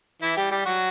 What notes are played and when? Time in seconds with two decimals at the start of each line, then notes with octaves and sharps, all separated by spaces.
0.22 E3 E4
0.37 G3 G4
0.51 G3 G4
0.66 F#3 F#4